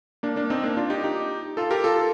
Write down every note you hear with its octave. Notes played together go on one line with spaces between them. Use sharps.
A#3 D4
A#3 D4
C4 D#4
A#3 D4
D4 F4
D#4 G4
D#4 G4
F4 A4
G4 A#4
F4 A4